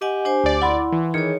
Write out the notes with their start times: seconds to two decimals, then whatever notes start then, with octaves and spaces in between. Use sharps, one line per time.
0.02 G4 D#5 F#5 G#5
0.25 D4 C5 G#5
0.44 D2 D5
0.62 E4 F#5 B5 C6
0.92 E3
1.14 D#3 G#4 C#5 C#7